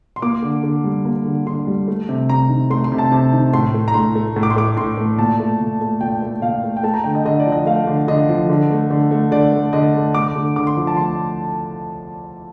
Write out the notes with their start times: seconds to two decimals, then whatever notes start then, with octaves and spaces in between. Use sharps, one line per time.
0.16 C6
0.22 A#3 D6
0.43 D3
0.64 D3
0.84 G3
1.05 A#3
1.25 D3
1.46 D3 C6
1.67 G3
1.88 A3
2.09 C3
2.29 C3 A#5
2.49 D#3
2.70 A3 C6
2.84 C6
2.92 C3
2.98 A5
3.12 C3
3.33 D#3
3.53 A2 C6
3.74 A3
3.88 A#5
3.94 A2 C6
4.15 A3
4.36 A2
4.43 D6
4.50 C6
4.56 A3 D6
4.77 A2 C6
4.98 A3
5.18 A#2 A5
5.40 A3
5.60 A#2
5.81 A3
6.01 A#2 G5
6.22 A3
6.42 A#2 F5
6.64 A3
6.77 G5
6.84 A3 A5
6.94 A#5
7.04 D3 G5
7.15 D#5
7.25 D3 D#5
7.40 D5
7.46 F3
7.52 D#5
7.66 A3 F5
7.87 D3
8.08 D3 D#5
8.29 F3
8.49 D3
8.70 A3
8.90 D3
9.11 A3
9.32 D3 D5
9.52 A3
9.73 D3 D#5
9.95 A3
10.15 A3 D6
10.36 D3
10.56 D3 D6
10.67 C6
10.77 F3
10.87 A5
10.97 A3 C6